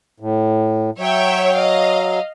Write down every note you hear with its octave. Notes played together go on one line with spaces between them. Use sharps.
A2
F#3 C#5 E5 G5
D#5 F5